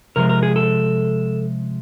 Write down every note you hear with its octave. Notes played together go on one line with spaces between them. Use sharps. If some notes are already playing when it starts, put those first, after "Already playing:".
C3 F3 G#3 A#4
A#4
G#4
A4